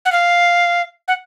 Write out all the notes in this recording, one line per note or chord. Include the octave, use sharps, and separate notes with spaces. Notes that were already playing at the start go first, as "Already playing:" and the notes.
F#5
F5
F#5